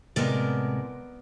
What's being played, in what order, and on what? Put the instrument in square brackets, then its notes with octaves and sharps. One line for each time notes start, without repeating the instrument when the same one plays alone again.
[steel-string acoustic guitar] A2 C3 G#3 [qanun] B3 A#4 D5